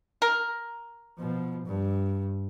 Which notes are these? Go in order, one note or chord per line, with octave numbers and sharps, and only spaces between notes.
A#4
B2 F3
G2